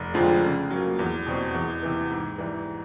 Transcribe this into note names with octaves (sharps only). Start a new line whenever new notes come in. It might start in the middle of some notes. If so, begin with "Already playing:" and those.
Already playing: F1
F2 D3 F3 G#3
C#3
F#3 A#3
E2
B2 G3 C4
E2
C3 E3
G#2
E3 G3